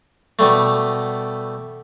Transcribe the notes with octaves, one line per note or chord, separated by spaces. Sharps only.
B2 G3 A3